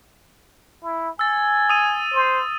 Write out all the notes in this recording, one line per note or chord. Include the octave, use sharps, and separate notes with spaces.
E4
G#5 E6 A6
D#6 E6 D#7
C5